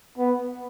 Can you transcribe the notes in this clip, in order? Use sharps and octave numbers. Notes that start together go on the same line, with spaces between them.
B3